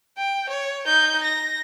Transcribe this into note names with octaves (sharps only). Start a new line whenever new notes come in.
G5
C#5
D#4 G6
A#6